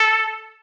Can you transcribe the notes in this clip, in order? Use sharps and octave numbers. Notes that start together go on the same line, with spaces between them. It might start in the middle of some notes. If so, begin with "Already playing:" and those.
Already playing: A4